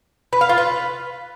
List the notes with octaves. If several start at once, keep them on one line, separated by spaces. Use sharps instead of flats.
B4
F5
F4
B4